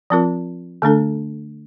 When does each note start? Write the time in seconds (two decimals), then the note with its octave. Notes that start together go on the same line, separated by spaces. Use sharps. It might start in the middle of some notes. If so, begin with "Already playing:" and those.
0.10 F3 C4 F4 A#4
0.82 D3 A3 D4 A4